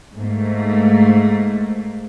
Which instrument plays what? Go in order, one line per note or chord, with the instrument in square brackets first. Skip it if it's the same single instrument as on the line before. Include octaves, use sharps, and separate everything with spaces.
[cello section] G#2 A3 A#3